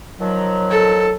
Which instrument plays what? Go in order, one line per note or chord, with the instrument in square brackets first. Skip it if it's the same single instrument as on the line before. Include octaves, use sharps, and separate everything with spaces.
[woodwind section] D#3 F3 F#3
[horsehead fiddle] A4